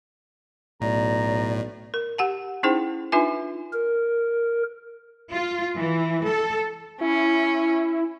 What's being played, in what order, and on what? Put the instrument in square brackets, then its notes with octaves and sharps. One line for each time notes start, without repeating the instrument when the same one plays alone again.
[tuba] B1 [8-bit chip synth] A2 [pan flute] D5 [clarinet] A#5
[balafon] A#4
G4 F#5 A5
C#4 D#4 E4 G#4 C5 G5
D4 D#4 F4 B4 E5 G#5
[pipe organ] A#4
[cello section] F4
E3
A4
[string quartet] C#4 [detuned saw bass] E4